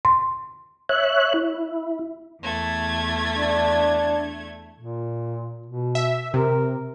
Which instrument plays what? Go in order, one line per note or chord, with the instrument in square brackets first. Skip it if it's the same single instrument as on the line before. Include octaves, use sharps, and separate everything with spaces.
[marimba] C6
[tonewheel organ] C#5 E5 F#6
E4
[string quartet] E2 A3 G#6
[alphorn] D4
[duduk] A#2
B2
[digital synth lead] E5
[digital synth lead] C3 [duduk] A#4